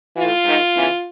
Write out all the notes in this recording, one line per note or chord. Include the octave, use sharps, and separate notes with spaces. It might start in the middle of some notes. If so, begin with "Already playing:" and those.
A2 E3 F4
G#2 D#3
E2 C#3 E3